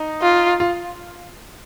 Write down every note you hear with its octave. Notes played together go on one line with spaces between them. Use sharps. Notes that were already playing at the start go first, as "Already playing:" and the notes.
Already playing: D#4
F4
F4